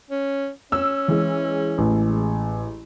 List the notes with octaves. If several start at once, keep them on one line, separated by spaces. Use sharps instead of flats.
C#4
C#4 E6
E3 G#3
A1